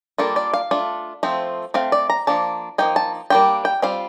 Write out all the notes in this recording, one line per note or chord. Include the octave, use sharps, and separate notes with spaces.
G3 A#3 D4 F4 A4
D5
F5
A3 D4 F4
F3 A3 C4
A3 C4 F5
D5
A#5
F3 A#3 D4 A5
F3 A#3 D#4 G5
A5
G3 A#3 D4 F4 G5
G5
G3 C4 F4 F5